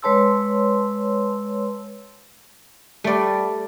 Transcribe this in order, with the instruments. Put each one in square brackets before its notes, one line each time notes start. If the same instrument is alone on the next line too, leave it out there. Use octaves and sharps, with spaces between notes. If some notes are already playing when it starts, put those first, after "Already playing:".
[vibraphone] G#3 B4 C#5 A5 C6 E6
[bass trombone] G3 [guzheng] A3 D5